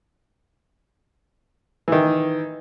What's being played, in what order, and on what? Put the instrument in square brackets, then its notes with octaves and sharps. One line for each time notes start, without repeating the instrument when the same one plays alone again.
[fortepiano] D#3 E3